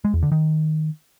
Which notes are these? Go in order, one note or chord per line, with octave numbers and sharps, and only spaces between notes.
G#3
E2
D3
D#3